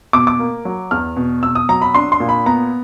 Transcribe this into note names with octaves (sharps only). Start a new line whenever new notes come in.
B2 D6
D6
A#3
F#3
E2 F6
B2
B2 E6
D#6
F#3 A#5
B5
D4 C6
C6
A#2
B5
B3 A#5